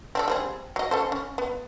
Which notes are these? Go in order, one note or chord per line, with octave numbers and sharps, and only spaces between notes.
C4 D4 A4
G3 C4 G#4
F#3 D#5
C#4 A4 C5
C#4
B3